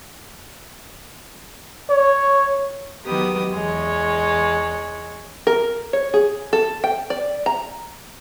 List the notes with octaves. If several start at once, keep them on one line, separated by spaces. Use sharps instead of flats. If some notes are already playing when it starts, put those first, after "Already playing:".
C#5
D#3 F#3 B3 G4 B4 D#6
E2 G#3 C#5
A#4
C#5
G#4
A4
G5
D5
A#5